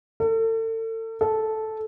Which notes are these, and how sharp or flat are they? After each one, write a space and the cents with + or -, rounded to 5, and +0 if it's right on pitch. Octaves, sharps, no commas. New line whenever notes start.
A4 +35
A4 -10